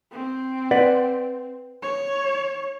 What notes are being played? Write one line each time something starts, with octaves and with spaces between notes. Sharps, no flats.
C4
B4 D5 F#5
C#5